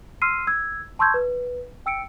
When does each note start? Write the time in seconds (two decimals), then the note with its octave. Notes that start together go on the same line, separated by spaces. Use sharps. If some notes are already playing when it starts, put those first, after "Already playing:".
0.22 C6 E6 F6 C7 D#7
0.47 E6 G#6
0.99 A5 C6 C#6 E6 G6 G#6
1.14 B4
1.86 G5 E6 C#7 D7